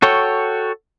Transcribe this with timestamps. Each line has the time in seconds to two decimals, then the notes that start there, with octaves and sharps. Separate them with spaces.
0.02 F#4 A4 C#5 G5